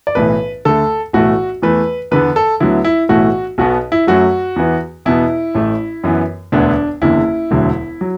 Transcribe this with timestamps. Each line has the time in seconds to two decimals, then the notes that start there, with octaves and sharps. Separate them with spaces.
0.07 D5
0.15 B1 A2 E3 B4
0.65 D2 D3 A3 A4
1.13 B1 A2 E3 A3 F#4
1.62 E2 E3 A3 B4
2.11 E2 D3 B3 B4
2.36 A4
2.60 D2 D3 F#3 B3 E4
2.84 E4
3.09 B1 A2 E3 A3 F#4
3.58 B1 B2 B3 F#4
3.92 E4
4.07 F#2 F#3 A3 F#4
4.56 E2 E3 B3
5.06 E2 B2 B3 E4
5.55 A1 A2 A3
6.03 F#2 E3 B3
6.52 E1 D2 D3 B3 D4
7.02 F#1 E2 D3 E4
7.51 E1 D2 D3 F#3
8.01 F#3